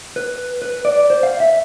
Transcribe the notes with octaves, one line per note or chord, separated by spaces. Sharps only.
B4
B4
D5
C5
F5
E5